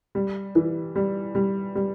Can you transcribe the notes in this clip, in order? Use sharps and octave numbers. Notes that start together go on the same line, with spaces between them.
G3
E3
G3
G3
G3